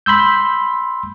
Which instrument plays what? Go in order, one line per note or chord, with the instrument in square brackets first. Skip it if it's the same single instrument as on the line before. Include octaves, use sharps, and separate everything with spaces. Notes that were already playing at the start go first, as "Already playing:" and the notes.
[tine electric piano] B5 C6 E6 G6